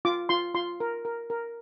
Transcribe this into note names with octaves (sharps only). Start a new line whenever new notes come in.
F4 D6
F4 C6
F4 C6
A#4
A#4
A#4